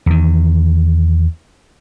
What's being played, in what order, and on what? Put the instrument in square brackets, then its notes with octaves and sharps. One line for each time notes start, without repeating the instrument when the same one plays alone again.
[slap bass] E2 D#3